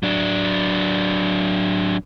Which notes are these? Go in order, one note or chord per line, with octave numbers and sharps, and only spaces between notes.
F#3 D4